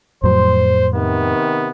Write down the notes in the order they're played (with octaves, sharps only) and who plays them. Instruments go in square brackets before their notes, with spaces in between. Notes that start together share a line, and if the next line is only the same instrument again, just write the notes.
[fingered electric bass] F2 A2 F#3 [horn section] C5
[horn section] C3 D#3 B3